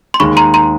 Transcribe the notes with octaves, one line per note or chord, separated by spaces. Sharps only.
C6
D#2 D#3 G#3 B5 C#6
A#5 C6
A#5 C6